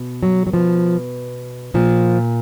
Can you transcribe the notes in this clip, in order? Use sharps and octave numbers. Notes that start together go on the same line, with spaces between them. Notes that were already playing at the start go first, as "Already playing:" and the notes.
Already playing: B2
F#3
F#3
B2 F3
A#2 F3